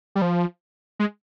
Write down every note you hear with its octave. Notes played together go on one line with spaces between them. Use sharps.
G3
F3
G#3